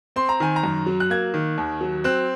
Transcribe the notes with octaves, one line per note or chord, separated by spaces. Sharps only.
C4 C6
A#5
D#3 G#5
A#5
F#2
F#3
F#6
A#3 G#6
D#3
D#2
F#3
C4 F#6